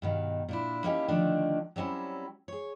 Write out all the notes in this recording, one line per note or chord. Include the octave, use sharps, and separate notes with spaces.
G2 B2 D#3
A#2 D4 E4
A#3 C#4 D#4 E4 G4
D3 D#3 F3 A3 D4 D#4
F#3 G3 C4 C#4 E4
G#4 C#5